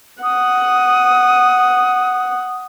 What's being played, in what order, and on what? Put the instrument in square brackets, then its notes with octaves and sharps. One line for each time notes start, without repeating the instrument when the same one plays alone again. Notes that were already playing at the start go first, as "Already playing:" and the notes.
[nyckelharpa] F#5 [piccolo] D#6